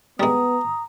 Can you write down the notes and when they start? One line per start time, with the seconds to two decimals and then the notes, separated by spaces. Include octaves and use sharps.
0.20 G3 G#3 B3 A#5 D#6